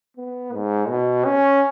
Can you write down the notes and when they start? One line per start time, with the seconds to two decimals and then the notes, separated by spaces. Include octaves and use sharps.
0.17 B3
0.53 G#2
0.89 B2
1.25 C#4